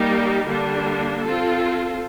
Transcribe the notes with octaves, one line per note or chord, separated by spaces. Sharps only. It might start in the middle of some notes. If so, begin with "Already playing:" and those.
Already playing: G3 A#3 D#4 G4 A#4
D3 G3 A#3 D4
C4 F4 A4